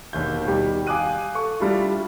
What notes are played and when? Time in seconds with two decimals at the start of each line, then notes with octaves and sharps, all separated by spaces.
0.13 E1 D#2 D#3 G6
0.45 B2 D#3 G3 G4
0.87 F5 G#5 D6 D#6 F#6 D#7
1.35 A4 C#6
1.60 G3 D4 E4 F4